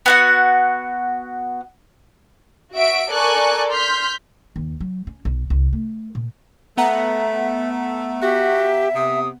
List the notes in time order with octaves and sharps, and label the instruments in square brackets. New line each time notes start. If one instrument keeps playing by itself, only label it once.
[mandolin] B3 F#4 F#5
[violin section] F#4 E5 D7
A4 A#4 D5 G#5 C#6 F#6
C6 F6 G6 B6
[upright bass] D#2
F#3
C#4
B1
C2
A3
A#2
[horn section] A3 [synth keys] B3 F#5 A#5 [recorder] E5
[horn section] F#4 [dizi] G4 [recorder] E5
[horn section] C3 [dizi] D#6